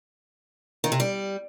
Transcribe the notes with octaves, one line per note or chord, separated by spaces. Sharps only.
D#3
C3
G3